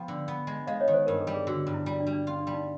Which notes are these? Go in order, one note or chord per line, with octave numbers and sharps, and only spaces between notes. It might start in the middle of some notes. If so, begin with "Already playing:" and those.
Already playing: F3 B3 F5 G5
D3
B3
G#3
G#3 D#5 F5
C#5 D#5
D#3
C5
G2 A#4
A4
G3
G#4
D3 F#4
G2
E4
G3 E4
D4
G3
D4
C#4 F4
D4
G3
D#4